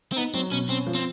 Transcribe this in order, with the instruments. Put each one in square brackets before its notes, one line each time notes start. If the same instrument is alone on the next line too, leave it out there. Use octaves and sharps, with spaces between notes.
[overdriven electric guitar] C4
[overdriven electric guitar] B3 [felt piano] D#4
[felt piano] F#3 [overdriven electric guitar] C4
[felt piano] B2 [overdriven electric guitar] C#4
[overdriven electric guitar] C4 [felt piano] C#4
[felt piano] F3
[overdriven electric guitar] C4